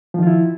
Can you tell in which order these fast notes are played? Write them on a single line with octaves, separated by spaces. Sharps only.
F3 D#3 F4 E4